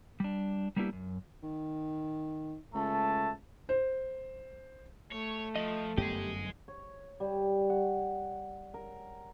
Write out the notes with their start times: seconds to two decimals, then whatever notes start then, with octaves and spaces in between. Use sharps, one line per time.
0.20 G3 D4
0.76 G3 A#3 B3 D4 E4 G4
0.93 F#2
1.43 D#3
2.74 C#2 A3 A5
3.69 C5
5.12 A3 C#5
5.55 F3 D#5
5.98 G1 F#2 B3 G4 G#4 D#5
6.68 C#5
7.20 G3
7.70 F#5
8.74 A#4